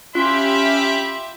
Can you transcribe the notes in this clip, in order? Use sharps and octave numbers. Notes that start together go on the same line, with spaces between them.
C#4 F4 G4 E5 B5 C6